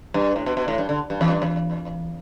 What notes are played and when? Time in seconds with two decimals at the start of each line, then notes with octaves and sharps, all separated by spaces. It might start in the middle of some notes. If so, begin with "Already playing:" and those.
0.14 G2
0.36 A2
0.46 B2
0.57 B2
0.68 A2
0.78 G2
0.89 D3
1.10 G2
1.21 E2
1.31 G2
1.42 E2